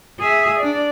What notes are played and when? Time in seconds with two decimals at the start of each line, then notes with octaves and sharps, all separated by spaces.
0.20 G#4 E5
0.60 D4 D5